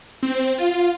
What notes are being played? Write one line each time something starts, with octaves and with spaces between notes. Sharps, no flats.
C4
F4